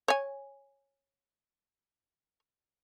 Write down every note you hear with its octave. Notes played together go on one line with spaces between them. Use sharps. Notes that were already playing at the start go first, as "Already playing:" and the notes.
C#5 G#5